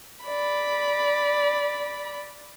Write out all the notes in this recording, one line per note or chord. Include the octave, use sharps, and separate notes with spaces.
D5 B5